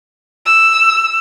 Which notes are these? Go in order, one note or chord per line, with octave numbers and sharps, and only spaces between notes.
E6